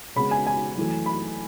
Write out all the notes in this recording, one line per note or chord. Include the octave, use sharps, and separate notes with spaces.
C#3 G#3 B3 B5
G#5
G#5
F#2 E3 A3
B5